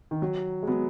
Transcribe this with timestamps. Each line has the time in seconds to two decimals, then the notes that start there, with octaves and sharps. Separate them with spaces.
0.11 D#3
0.22 F#3
0.63 G#3
0.67 F#3 B3